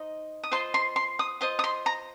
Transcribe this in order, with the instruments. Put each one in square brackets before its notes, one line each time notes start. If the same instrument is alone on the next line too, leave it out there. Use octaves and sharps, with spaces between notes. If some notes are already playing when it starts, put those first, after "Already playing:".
Already playing: [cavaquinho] D#4 C5 D#5
D#6
F4 C5 D#5 C6
C6
C6
D#6
F4 C5 D#5 D#6
D#6
C6
A#5